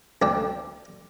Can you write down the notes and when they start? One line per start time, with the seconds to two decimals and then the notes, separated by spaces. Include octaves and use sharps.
0.22 D2 D4 G5